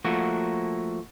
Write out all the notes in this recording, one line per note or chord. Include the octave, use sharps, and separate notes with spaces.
F3 A3 A#3 F#4